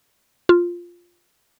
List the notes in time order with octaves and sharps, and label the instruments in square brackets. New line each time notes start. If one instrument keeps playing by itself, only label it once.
[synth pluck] F4